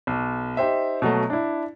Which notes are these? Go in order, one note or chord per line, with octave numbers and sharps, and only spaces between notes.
B1
D#4 G4 C5 E5
B2 F#3 A3
D4 E4